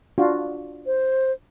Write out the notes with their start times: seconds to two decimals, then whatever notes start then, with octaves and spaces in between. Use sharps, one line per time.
0.18 D4 F4 F#4
0.86 C5